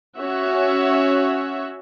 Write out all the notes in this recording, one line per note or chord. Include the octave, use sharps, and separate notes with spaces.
C#4 F#4 C#5 E5